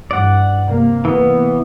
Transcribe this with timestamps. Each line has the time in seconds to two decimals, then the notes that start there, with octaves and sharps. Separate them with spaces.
0.11 G2 E3 D5 F#5
0.65 C3 A#3
1.05 E3 B3